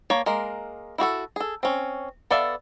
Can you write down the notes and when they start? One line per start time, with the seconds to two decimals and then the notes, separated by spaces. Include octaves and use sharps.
0.10 A#3 C#5 A5
0.26 G#3 A#3 A#4
0.98 E4 F#4 G#4 A4
1.36 G#4 A4
1.63 C4 C#4
2.30 B3 A4 D5 E5 F5